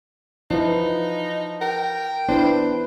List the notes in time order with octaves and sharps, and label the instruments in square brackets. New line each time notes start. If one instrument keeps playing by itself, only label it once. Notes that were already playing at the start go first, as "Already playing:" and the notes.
[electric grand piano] F3 [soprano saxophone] D#4 [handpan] E4 B4
[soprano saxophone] A#4 [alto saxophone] G5
[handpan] B3 E4 B4 [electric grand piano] D4 [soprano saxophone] C5